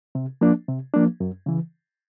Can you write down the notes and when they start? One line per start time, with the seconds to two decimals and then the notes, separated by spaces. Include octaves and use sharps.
0.15 C3
0.41 F3 A#3 D4
0.68 C3
0.94 F3 A#3 D4
1.20 F#2
1.46 C#3 E3